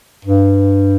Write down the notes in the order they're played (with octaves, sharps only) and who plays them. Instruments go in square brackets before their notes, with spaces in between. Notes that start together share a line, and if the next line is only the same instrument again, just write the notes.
[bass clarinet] G2